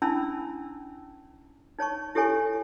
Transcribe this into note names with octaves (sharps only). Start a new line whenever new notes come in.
C#4 D4 E4 A5 B5 E6
D#4 C#5 A5 C#6
E4 G4 A4 C#5 G#5 C#6